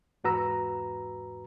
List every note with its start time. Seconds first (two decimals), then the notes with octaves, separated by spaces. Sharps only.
0.24 E2 G#2 F#4 B4 A#5 E6